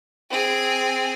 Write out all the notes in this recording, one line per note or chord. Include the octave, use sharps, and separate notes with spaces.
C4 G#4